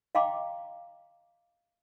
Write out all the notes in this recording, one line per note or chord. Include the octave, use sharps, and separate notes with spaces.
D#5 F5 G5 A#5 C6 D6